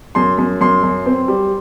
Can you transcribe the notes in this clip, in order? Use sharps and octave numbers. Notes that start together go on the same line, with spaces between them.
F#2 C6
F#2
F#2 C6
F#2
C4
G3